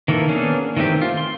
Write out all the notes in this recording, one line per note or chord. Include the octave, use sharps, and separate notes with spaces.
D#3 E3 A#3 A4
A#3 B3 C#4 D4 G#4
D#3 E3 A3 C4 G4
F4
C6